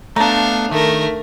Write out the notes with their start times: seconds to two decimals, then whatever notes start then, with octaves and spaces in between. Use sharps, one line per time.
0.16 A3 B3 D4 F5 A5 A#5
0.71 D#3 A3 A#4